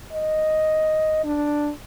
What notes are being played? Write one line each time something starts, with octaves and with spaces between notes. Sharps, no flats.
D#5
D4